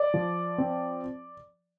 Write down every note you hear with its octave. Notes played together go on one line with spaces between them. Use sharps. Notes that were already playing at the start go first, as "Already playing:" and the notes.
Already playing: D5
F3
C4